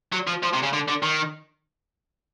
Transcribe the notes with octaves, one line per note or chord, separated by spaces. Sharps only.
F#3
F3
F3
C3
C#3
D3
D3
D#3